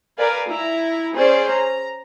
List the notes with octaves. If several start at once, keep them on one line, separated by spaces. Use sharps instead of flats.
A#4 B4 D5 F5 G#5
E4 A#5
C#4 G#4 C5 D5
A#5